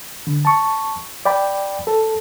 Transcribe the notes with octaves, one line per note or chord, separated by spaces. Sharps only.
D3
A5 C#6
D5 G5 B5
A4